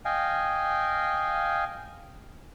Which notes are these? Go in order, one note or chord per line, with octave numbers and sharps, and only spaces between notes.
D#5 F5 G5 G#5